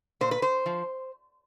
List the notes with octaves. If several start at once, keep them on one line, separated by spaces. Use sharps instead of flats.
A#2 C5
B4
C5
F3